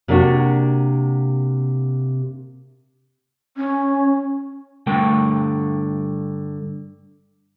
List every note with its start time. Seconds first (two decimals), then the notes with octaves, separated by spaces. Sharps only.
0.08 C3 A#3 D4 F#4
3.56 C#4
4.87 G2 D3 A3 A#4 G5